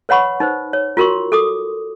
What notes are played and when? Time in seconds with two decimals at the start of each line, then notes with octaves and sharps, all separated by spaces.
0.09 B4 C#5 F#5 B5 C#6
0.40 D#4 B4 C5
0.73 C#5
0.97 F4 F#4 A#4 C6 C#6
1.32 A4 D6 D#6